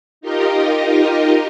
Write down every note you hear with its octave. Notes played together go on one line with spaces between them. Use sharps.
D#4 F4 G4 A#4 D#5